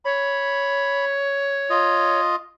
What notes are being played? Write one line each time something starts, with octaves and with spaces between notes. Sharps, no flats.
C#5 B5
F4 D#5